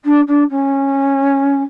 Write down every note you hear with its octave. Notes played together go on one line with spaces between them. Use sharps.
D4
D4
C#4